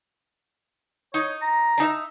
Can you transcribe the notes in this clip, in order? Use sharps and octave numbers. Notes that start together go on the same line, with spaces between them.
D#4 C#5
A#5
D4 D#4 E5